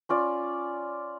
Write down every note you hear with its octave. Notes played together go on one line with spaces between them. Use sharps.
C#4 F4 D5